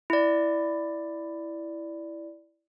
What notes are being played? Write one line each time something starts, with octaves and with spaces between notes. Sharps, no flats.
E4 D5